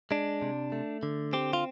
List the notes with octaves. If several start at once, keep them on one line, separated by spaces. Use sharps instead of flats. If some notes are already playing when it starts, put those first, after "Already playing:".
G#3 D4
C3
A3
D3
C4 G4
F4